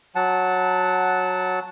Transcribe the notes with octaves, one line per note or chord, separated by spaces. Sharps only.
F#3 F#5 A5